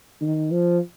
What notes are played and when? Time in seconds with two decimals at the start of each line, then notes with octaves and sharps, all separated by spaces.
0.21 D#3
0.51 F3